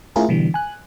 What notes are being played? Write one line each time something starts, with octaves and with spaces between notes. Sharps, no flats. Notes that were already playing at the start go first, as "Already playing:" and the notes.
A3 C#4 E4 F4 G#4 A#4
B2 D3 E3 G3
G#5 F#6